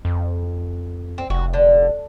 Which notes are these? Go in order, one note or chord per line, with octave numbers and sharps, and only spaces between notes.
F2
C4
F1 F#4
D3